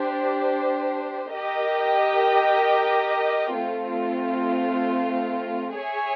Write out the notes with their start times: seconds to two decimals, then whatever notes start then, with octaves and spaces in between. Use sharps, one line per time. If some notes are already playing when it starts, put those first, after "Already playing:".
Already playing: D4 G4 C5
1.36 G4 A#4 D#5 G5
3.57 A3 C4 F4
5.78 G#4 C#5 E5 G#5